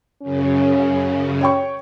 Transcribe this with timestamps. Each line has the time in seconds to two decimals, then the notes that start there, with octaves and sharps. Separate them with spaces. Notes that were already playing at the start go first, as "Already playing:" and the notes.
0.22 F#2 C#3 C#4
1.41 C#5 G5 C#6